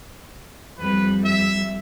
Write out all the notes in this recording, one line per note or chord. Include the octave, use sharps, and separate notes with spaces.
F2 G3 B4
E5